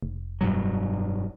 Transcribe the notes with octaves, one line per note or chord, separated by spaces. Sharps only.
F1
G2 B2 F#3